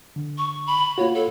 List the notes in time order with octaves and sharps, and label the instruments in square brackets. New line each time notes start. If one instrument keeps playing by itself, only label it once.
[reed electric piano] D3
[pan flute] C#6
B5
[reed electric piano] A#3 F4 F#4 [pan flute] C#5
[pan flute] A4